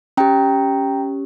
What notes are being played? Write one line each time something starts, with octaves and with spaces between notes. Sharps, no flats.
C#4 G4 G5 A#5